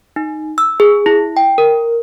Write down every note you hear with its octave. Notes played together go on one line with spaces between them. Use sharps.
D#4
E6
G#4
E4
G5
A#4